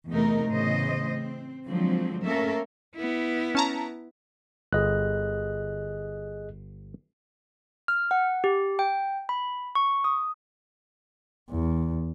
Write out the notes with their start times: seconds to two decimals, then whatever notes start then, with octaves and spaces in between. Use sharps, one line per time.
0.10 E2 C3 A3 D#4 A#4
0.48 A2 C#3 E3 B3 C5 D#5
1.09 C4
1.66 D3 F3 F#3 G#3 C4
2.25 A3 A#3 C#4 A4 A#4 E5
2.96 B3 E4
3.55 C#4 A5 A#5
4.73 G1 G#4 D#5 F#6
7.88 F6
8.11 F#5
8.44 G4
8.79 G5
9.29 B5
9.75 C#6
10.04 D#6
11.51 E2